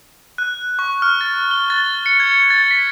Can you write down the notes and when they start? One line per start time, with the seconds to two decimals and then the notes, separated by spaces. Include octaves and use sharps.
0.38 F#6
0.79 C#6
1.02 F6
1.21 A6
1.51 G7
1.70 A6
2.06 C#7
2.20 G#6
2.50 A6
2.71 B6